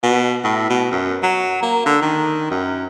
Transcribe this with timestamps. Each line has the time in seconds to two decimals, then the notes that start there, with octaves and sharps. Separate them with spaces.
0.03 B2
0.44 A2
0.70 B2
0.92 F#2
1.23 F#3
1.62 A#3
1.86 D3
2.02 D#3
2.51 F#2